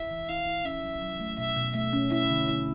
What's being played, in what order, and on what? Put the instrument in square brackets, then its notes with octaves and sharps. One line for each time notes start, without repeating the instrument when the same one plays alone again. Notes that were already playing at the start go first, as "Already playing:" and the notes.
Already playing: [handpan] E4 [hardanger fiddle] E5
[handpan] E3
[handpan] E4 [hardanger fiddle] F5
[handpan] E4
[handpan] C#4 [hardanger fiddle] E5
[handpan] F#3
F#3
A3
[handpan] B2 [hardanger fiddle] E5
[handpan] B2
[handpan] A3 [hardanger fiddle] E5
[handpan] C#4
[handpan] E4 [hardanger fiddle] E5
[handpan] D3
E4